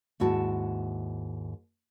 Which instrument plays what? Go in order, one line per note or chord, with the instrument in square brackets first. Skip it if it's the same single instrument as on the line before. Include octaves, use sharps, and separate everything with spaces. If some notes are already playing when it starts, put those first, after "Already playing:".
[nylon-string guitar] D#2 G#2 E4 F#4 A5